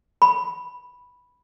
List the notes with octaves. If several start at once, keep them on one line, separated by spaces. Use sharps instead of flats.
B5